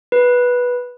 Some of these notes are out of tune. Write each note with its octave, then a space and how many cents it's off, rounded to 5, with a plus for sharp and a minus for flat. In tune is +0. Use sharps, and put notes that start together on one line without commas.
B4 -10